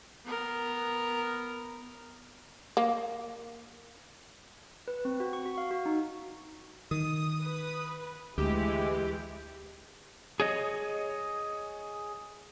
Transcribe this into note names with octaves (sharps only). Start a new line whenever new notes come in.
B3 A#4
A#3
B4
C4
F#4
C#6
F#4
F5
F#4
D#4
D#3 D#6
B4
D2 E3 G#3 E4 G4
G#4 C#5 D#5